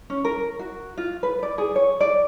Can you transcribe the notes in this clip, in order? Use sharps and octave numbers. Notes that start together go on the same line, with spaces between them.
C#4
A#4
F#4
F4
B4
D5
G#4
C#5
D5